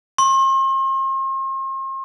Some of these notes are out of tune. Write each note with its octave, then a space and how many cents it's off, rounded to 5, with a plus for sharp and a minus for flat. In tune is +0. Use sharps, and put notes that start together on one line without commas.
C6 +40